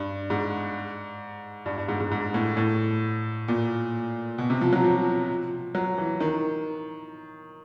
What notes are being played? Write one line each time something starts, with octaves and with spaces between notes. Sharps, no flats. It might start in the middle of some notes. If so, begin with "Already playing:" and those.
Already playing: G2
G#2
G2
G2
G#2
G#2
G#2
A2
A2
A#2
B2
C3
F3
F#3
F3
F#3
E3
D#3